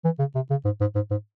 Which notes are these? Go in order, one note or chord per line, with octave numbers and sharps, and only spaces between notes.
E3
C#3
C3
C#3
G#2
G#2
G#2
G#2